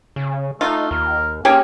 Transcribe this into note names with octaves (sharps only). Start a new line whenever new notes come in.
C#3
A3 D#4 F4
D#2 A#4
A#3 C#4 G4 G#4 C#5